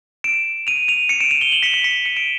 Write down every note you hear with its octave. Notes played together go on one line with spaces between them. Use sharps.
D7 E7
D#7 F7
D#7 F7
C#7 D#7
D7 E7
D#7 F7
F7 G7
E7 F#7
B6 C#7
B6 C#7
B6 C#7
C#7 D#7
D7 E7